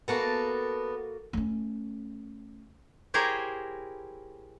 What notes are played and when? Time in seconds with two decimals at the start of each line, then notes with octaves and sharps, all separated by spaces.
0.08 A#3 B3 F#4 A4 A5
1.33 A3 C#4
3.14 E4 G4 G#4 A#4 C5 C#5